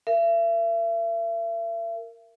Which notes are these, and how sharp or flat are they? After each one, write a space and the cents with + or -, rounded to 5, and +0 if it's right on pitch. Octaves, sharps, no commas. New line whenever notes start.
A#4 -15 E5 +40